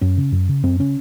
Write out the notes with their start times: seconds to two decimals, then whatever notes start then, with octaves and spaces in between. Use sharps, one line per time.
0.01 F#2 C#4
0.17 C#3
0.32 F#2
0.49 C#3
0.63 F#2 C4
0.79 C#3 C#4